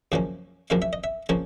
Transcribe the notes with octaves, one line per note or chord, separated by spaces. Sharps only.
F#2 C#3 F3 A#3 C#4
F#2 C#3 F3 A#3 C#4 F5
E5
D#5
E5
C#3 F3 A#3 C#4 A5